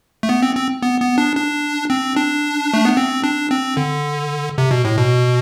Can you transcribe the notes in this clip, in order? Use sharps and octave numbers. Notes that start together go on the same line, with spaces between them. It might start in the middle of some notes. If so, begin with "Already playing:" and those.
A3
B3
C4
C4
B3
B3
D4
D4
C4
D4
A3
B3
C4
D4
C4
D3
C3
B2
A2
B2